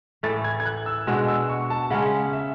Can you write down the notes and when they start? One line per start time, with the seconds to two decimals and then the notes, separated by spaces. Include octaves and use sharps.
0.23 A2 E3 A3 A6
0.44 G#6
0.60 G#6
0.65 F#6
0.86 E6
1.07 B2 G#3 D4 F#4 E6
1.28 E6
1.49 C#6
1.70 A5
1.90 C#3 G#3 C#4 F#5
2.33 E5